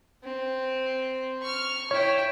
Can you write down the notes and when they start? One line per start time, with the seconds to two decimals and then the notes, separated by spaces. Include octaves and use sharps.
0.24 C4
1.42 C#6 F6
1.91 E4 C#5 G5